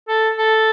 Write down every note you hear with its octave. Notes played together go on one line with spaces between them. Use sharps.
A4
A4